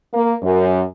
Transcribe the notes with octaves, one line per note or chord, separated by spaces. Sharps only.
A#3
F#2